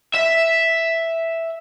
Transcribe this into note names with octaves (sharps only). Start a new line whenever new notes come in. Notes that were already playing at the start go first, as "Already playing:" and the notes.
E5